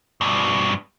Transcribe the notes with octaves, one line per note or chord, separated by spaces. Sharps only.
G2 B2